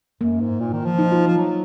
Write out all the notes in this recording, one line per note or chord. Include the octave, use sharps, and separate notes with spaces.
F#2 A#3
G#2
A#2
D#3
F3
D#4
F4
F3
F#3